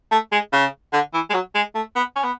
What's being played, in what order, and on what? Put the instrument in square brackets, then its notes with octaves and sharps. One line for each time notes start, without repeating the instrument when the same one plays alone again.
[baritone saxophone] A3
G#3
C#3
D3
E3
G#3
F#3
G#3
A3
B3
C#4
B3